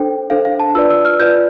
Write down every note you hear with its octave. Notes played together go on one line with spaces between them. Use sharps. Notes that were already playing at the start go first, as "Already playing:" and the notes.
Already playing: D4 A4 C5 G5
D4 A4 C5 F5
F5
A5
F4 B4 D5 E6
E6
F6
F4 B4 D5 G6